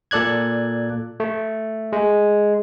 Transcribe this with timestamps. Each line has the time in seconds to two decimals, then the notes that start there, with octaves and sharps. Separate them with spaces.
0.11 A#2 A4 D5 F#6 G#6
1.20 A3
1.92 G#3